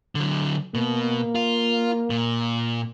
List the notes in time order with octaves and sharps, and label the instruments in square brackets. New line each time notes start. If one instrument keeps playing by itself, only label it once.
[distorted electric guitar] D3 F#3
[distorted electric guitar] B2 [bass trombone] A#3
[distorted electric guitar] F4
A#2